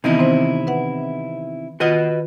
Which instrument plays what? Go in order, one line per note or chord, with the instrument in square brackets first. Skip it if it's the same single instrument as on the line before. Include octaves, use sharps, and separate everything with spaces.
[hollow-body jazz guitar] C3 D#4 E4 [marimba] D#3 E3 B3
[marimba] C4 C5
B4 E5 F#5
[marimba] D#3 F4 [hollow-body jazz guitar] F#4 B4 D#5